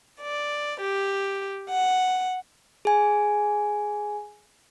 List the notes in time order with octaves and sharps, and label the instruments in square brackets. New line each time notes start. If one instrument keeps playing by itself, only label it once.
[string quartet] D5
G4
F#5
[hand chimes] G#4 G#5